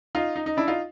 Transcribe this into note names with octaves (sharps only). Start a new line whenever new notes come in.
D#4 F4
D#4
D#4
D4 E4
D#4 F4